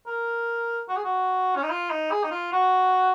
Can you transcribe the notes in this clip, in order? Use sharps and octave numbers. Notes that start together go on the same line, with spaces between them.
A#4
F#4
G#4
F#4
C#4
D#4
F4
D#4
G#4
D#4
F4
F#4